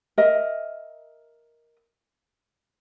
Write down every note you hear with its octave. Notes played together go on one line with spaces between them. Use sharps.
A#4 D#5 E5